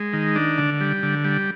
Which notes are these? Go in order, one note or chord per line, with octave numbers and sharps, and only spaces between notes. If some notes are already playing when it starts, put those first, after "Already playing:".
Already playing: G#3
D#3
D4
D3
G3
D3
G3